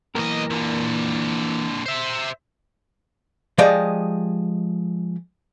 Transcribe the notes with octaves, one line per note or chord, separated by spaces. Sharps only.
B1 E3 A#3 A#4 D#5
A#2 D3
C5 E5
F3 G#3 G4 D5 D#5